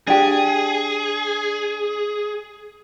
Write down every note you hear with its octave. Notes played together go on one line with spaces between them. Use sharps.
D4 G4 G#4